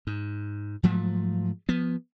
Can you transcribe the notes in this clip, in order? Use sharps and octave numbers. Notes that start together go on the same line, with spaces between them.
G#2
G#2 F3 F#3 A3
F3 B3